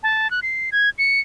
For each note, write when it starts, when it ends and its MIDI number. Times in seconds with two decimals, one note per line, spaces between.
0.03 0.31 81
0.31 0.40 90
0.43 0.70 96
0.72 0.90 92
0.98 1.20 97